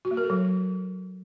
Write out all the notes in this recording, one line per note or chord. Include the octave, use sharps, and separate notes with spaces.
F#4
A#3
A#4
A4
F#3